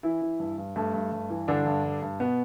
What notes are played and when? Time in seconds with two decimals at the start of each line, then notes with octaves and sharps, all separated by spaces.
0.03 E3 E4
0.22 E3
0.40 G2
0.58 G2
0.76 G2 A3
0.94 G2
1.12 G2
1.30 E3
1.48 G2 D3 D4
1.66 G2
1.84 G2
2.02 G2
2.20 B2 B3